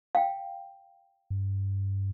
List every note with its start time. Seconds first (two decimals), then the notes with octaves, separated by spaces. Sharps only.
0.15 F5 G5
1.30 G2